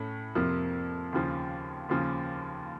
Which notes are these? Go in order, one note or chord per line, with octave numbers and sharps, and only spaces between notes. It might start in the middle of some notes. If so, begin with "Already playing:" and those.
Already playing: A2 A3 C#4
F2 C3 F3 A#3
D#2 C#3 F3
D#2 C#3 F3